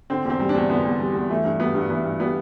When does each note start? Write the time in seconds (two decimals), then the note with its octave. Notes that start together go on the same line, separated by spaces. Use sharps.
0.10 D3 C4
0.25 E2
0.30 C4
0.40 G3
0.49 D4
0.55 E2
0.70 D3 B3
0.85 E2
1.00 G3
1.15 E2
1.30 E3 A3
1.45 G2
1.60 G3 B3
1.75 G2
1.90 E3 B3
2.05 G2
2.20 G3 B3